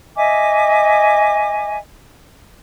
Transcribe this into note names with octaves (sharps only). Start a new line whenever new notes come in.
D#5 E5 G#5 D6